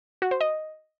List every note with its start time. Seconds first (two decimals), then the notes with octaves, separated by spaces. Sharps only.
0.22 F#4
0.31 C5
0.41 D#5